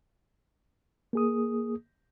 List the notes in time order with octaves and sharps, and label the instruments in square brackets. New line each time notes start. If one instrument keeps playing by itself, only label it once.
[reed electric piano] A#3 G#4 D#6